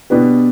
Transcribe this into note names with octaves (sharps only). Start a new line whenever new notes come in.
B2 B3 D4 G4 B4